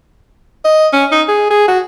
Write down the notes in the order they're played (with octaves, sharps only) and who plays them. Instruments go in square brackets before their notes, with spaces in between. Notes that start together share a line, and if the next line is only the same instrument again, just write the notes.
[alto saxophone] D#5
C#4
D#4
G#4
G#4
F#4